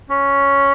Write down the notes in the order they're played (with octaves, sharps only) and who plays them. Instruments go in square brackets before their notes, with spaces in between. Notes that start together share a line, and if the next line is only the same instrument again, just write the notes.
[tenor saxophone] C#4